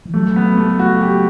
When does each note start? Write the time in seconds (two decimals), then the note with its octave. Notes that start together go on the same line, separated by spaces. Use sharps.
0.06 E3
0.14 F#3 A3
0.36 B3
0.57 A3
0.79 F#4
1.02 G4